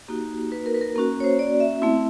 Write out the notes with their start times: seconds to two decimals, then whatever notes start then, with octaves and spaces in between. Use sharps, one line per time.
0.08 A#3 D#4 F#4 G4
0.52 B4
0.66 A#4
0.74 B4
0.81 A#4
0.96 A#3 C#4 F#4 A#4
1.20 C#5
1.24 C5
1.39 D5
1.60 E5
1.82 A3 C4 E4